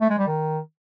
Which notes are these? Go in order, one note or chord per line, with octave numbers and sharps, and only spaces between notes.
A3
G#3
G3
D#3